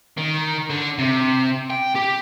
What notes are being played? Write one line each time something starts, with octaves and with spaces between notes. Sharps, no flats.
D#3
D3
C3
G5
G4